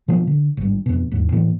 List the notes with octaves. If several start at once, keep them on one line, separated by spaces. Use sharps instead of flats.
B2 F3 A#3
D3
G#1 G2
F2 B2
E1 D#2 G#2
A2 E3 A#3